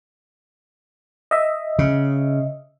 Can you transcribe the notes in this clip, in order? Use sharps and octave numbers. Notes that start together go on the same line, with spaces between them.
D#5 E5
C#3